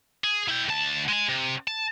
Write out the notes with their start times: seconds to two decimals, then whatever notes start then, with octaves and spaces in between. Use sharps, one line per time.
0.24 G#4
0.49 E4 G5
0.69 D2 A5
1.08 G#3 G#5
1.29 C3
1.68 A5